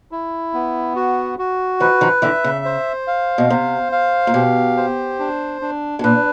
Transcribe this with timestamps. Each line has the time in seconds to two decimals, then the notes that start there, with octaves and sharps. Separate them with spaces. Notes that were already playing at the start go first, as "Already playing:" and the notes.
0.11 E4
0.54 B3
0.96 F#4
1.38 F#4
1.80 D#3 F3 B4
2.01 D#3 F3
2.22 D3 E3 E5
2.44 C#3
2.65 C5
3.07 F5
3.38 B2
3.50 C3 C5
3.92 F5
4.27 A#2
4.34 B2 G4
4.77 C5
5.20 D4
5.62 D4
5.99 B2
6.04 A#2 B4